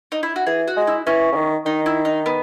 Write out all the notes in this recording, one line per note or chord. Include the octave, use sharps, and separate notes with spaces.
D#4
E4
F#4
E3 G#4
F#4
G#3
E4
E3 C#4
C#3
D#3
D#3 D#4
E4
D#4
B3